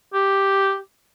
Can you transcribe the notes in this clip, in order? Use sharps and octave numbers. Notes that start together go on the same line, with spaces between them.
G4